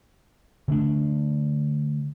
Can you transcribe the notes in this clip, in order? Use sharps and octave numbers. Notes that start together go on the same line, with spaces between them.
D3 A3 D4